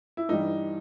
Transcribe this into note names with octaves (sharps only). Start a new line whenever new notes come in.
E4
G2 E3 G3 D#4